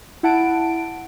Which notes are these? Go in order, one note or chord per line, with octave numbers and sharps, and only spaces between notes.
E4 F#5 A5 D7